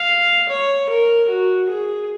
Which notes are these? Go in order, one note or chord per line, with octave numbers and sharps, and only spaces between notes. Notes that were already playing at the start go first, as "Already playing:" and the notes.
Already playing: F5
C#5
A#4
F#4
G#4